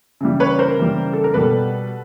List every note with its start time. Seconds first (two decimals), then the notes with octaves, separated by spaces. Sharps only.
0.21 C#3 E3 G3
0.40 B4 C#5
0.59 A#4 C5
0.78 C#3 E3 G3
1.13 A4
1.24 A#4
1.34 B2 G3 A4 B4